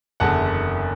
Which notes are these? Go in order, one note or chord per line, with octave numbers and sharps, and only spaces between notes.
F#1 E2 D3 F#5 A5